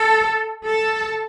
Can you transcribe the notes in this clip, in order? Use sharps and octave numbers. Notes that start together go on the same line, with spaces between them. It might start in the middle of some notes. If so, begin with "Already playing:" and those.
Already playing: A4
A4